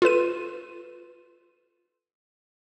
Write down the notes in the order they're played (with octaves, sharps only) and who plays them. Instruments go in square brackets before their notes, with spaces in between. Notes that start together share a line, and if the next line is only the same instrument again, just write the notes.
[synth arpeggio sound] F4 A4 B4 D#7